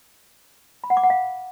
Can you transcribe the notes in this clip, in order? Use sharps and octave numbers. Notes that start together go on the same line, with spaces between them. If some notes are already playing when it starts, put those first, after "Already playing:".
B5
F#5
D6
F#5
F5